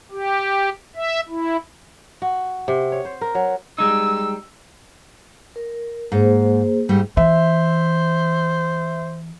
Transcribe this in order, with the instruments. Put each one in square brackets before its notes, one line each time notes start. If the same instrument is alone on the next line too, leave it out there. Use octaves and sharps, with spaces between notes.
[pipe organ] G4
E5
E4
[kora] F#4
C3
C#5
C5
A#4
F#3
[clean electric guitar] G3 G#3 D#4 [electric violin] E6
[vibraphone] A#4
[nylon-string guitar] G#2 [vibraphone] A#3 G#4 C5
[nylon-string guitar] G#2 G3 A3
[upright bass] E3 [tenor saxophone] C5 [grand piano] E5